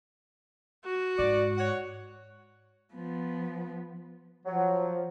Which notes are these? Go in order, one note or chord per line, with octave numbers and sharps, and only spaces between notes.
F#4
G#2 D5
C#5 F#5
F3 B3
F3 F#3